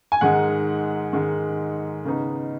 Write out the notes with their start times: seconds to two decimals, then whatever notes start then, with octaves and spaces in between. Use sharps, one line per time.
0.12 G#5
0.21 G#2 D#3 G#3 F#5
1.13 G#2 D#3 G#3
2.05 C#3 B3 D#4